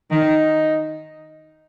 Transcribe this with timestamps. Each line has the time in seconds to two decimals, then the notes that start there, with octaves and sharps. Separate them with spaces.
0.11 D#3 D#4